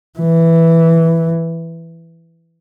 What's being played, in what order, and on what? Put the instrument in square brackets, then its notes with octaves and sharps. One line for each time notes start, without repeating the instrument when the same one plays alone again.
[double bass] E3